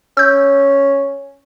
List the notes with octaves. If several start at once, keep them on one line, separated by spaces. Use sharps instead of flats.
C#4 E6 G6